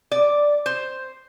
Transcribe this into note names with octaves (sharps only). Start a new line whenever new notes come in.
D5
C5